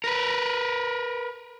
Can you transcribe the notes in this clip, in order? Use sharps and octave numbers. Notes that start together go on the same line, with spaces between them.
A#4 B4